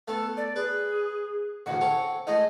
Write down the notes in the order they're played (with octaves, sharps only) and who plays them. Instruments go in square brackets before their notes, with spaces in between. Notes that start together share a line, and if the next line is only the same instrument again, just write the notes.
[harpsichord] A3 B3 [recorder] A4
[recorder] D5
[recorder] G#4 [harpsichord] B4
[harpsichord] A1 D2 C#3 [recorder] F#5
[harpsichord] C4 A4 C#5
[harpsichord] G#3 A3 E4 [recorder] D#5